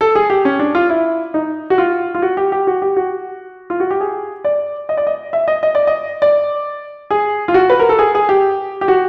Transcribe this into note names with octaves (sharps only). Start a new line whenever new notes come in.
A4
G#4
G4
C#4
D4
F4
E4
D#4
F#4
F4
F4
F#4
G4
G4
F#4
G4
F#4
F4
F#4
G4
G#4
D5
D#5
D5
D#5
E5
D#5
D#5
D5
D#5
D5
G#4
F4
F#4
B4
A#4
A4
G#4
G#4
G4
G4
F#4